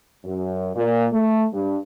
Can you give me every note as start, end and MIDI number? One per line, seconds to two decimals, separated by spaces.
0.25 0.70 42
0.75 1.07 46
1.13 1.46 57
1.53 1.77 43